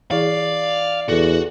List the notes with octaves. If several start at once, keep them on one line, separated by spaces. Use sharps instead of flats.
E3 E4 G#4 D5 F5
E2 F#4 A4